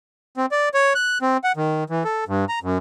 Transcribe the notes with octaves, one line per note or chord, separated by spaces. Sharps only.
C4
D5
C#5
F#6
C4
F#5
D#3
E3
A4
G2
A#5
F#2